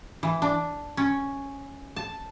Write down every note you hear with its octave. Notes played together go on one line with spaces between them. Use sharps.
E3
D4
C#4
A5